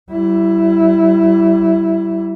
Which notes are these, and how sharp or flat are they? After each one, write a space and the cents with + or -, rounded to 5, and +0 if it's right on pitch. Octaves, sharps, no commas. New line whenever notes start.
G3 -35 E4 +5